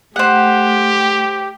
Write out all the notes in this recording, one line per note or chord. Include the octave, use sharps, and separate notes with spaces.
A3 G4 C5 F#5